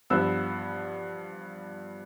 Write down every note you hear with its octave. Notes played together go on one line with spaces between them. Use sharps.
G2 F3 B3 E6